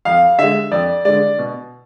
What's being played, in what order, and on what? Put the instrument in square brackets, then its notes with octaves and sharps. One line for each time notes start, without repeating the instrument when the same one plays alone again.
[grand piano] F2 F5
D3 G#3 E5
F2 D5
D3 G#3 D5
B2